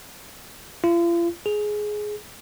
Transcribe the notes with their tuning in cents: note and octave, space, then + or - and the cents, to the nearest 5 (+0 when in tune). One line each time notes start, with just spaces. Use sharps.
F4 -40
G#4 +10